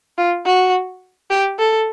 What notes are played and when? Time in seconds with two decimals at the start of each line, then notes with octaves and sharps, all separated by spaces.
0.18 F4
0.46 F#4
1.30 G4
1.59 A4